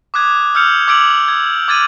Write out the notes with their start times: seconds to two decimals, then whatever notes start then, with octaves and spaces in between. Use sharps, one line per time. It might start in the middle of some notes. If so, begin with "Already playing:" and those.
0.14 D6 D#6 F#6 G#6
0.55 E6 F6 G6 C#7 F7
0.88 D6 E6 G#6 D7 F7 F#7
1.28 G#6
1.68 D6 G#6 A6 D#7 F#7